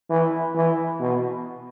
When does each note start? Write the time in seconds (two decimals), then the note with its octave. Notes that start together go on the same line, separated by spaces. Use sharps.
0.10 E3
0.55 E3
1.00 B2